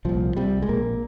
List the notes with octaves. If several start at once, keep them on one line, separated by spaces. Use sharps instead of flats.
C2 A#2 F3
C2 C3 G3
G#3
A#1 A#2 A#3